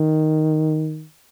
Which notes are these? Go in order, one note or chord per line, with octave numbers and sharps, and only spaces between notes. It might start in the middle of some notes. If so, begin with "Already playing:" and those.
Already playing: D#3